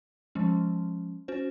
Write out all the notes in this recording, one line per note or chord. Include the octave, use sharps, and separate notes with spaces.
F3 G#3 C#4
C#4 F#4 C5